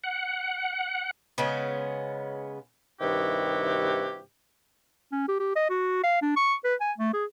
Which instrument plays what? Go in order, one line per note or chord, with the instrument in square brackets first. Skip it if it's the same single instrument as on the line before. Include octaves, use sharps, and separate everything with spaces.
[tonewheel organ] F#5
[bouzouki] C#3 G#3 B3 C#4
[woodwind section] G2 C3 D#3 E4 F#4 G4
[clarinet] C#4
G4
G4
D#5
F#4
F5
D4
C#6
B4
G#5
A3
G#4